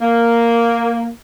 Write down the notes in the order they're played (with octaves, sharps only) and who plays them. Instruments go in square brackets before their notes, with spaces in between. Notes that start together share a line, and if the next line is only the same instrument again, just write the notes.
[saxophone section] A#3